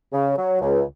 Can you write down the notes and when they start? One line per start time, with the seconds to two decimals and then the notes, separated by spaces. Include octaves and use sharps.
0.13 C#3
0.37 F#3
0.60 C#2